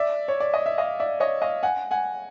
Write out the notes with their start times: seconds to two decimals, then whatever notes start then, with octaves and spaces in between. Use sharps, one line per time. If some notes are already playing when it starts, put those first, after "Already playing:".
Already playing: D5 E5
0.28 C#5
0.40 D5
0.54 D#5
0.66 E5
0.78 D#5 F5
1.00 D5 E5
1.20 C#5 D#5
1.42 D#5 F5
1.63 F#5 G#5
1.91 F#5 G#5